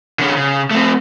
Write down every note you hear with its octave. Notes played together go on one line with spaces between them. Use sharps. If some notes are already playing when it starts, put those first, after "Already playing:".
D3 C#4
C#3
A3 C4